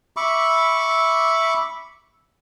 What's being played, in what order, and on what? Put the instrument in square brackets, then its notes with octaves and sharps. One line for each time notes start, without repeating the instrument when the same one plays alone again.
[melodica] E5 B5 C#6 D6